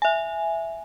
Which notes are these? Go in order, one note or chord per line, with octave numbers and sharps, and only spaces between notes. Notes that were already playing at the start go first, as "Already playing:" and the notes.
E5 G#5